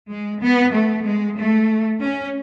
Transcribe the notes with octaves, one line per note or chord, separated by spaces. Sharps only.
G#3
B3
A3
G#3
A3
C#4